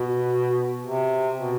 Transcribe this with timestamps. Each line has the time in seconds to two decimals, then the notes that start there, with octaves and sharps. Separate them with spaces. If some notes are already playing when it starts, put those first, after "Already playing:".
Already playing: B2
0.83 C3
1.35 B2